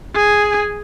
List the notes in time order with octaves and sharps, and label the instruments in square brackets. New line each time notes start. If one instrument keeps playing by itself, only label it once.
[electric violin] G#4 G#5